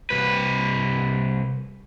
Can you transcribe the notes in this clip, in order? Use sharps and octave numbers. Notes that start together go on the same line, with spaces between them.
C2 B4